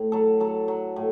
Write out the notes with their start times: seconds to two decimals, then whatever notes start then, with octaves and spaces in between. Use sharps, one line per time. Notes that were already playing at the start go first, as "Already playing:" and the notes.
Already playing: A2
0.12 F#3 A4
0.40 F#3 A4
0.68 F#3
0.96 A2